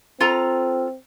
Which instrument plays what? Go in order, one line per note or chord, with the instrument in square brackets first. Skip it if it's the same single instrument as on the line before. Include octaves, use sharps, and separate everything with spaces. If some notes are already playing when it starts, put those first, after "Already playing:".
[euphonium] C4 [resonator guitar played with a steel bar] F4 A4 A#5